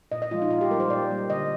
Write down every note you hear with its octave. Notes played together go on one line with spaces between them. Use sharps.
A#2 D#5
D#5
F3 G#3 F4
D#4
A#2 F4
G4
G3 A#3 A#4
C5
A#2 D5
G3 A#3
D3 D#5